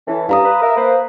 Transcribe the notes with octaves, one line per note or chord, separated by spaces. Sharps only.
E3 C#4 A4
G2 F5 A#5 D#6
B4
A#4 E5
A#3 B4 C5